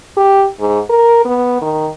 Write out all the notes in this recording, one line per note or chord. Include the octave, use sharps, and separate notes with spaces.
G4
G#2
A#4
B3
D#3